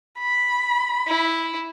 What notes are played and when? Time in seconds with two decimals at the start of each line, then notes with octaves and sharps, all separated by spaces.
0.18 B5
1.07 E4